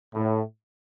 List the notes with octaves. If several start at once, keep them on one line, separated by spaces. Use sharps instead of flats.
A2